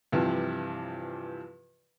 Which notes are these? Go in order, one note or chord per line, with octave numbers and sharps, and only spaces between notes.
G2 C3 E3 F3